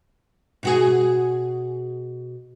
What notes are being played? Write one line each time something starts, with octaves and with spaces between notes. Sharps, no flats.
B2 F#4 G#4